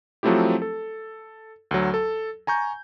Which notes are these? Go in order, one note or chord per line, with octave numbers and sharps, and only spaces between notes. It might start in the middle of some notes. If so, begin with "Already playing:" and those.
F3 F#3 A3 C4 E4 G4
A4
D2 F#3
A4
G#5 A#5 C#6 G6